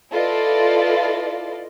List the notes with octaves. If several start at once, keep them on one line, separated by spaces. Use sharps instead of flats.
E4 F4 A4 B4 D5 D#5